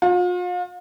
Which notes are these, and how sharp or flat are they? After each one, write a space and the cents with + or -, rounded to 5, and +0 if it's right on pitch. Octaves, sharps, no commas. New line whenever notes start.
F4 +40